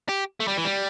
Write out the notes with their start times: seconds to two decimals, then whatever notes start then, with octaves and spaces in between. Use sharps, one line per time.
0.09 G4
0.40 A3
0.48 G3
0.57 E3
0.65 G3